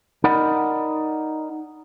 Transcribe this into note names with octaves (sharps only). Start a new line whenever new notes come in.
D#4 A#4 D5 D#5 F#5 B5